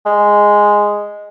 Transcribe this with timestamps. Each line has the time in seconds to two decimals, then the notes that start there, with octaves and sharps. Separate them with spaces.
0.06 G#3